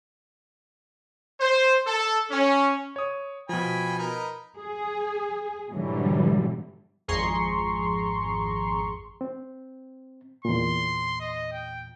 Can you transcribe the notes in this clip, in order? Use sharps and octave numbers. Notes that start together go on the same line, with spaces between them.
C5
A4
C#4
C#5 D#6
B2 F3 G5 G#5 B5
D#4 A#4 B4
G#4
G#2 B2 D3 E3 F#3 G3
G#1 F2 G#4 A#5 C6 C#6
C4
E2 A#2 C6
D#5
G5